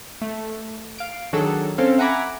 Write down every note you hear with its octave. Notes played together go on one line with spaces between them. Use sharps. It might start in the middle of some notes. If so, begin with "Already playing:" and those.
A3
F5 D7
D#3 F#3 D4 F#4 G#4 A4
C4 C#4 A4 C5 F5
E5 F#5 G#5 A#5 B5 D6